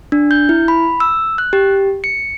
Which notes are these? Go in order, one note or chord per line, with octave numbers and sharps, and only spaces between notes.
D4
G6
E4
B5
E6
F#6
G4
C#7